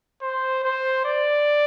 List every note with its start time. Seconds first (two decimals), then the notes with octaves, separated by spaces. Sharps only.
0.22 C5
0.64 C5
1.06 D5